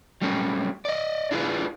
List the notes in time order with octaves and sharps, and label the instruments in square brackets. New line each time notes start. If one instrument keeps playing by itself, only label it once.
[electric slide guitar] F#3 G3 A3 C4 C#4
D5 D#5
D4 E4 F4 G#4 A4 B4